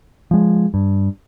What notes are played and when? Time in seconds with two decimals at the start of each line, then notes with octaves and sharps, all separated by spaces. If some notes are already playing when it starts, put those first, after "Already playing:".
0.31 F3 G#3
0.74 G2